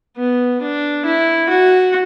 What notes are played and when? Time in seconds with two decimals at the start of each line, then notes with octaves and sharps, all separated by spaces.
0.17 B3
0.61 D4
1.06 E4
1.49 F#4